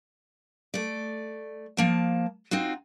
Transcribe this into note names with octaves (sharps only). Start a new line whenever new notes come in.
A3 D5
F3 A#3 A5
C4 D#4 F4 F#4